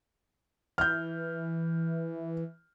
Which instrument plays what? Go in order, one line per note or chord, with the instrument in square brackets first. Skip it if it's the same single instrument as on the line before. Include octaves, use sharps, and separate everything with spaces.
[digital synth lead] E3 [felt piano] F6 G6